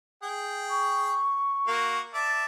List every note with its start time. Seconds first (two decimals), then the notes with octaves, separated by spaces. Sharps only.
0.23 G#4 G5
0.70 C#6
1.67 A#3 F#4
2.14 D5 E5 A5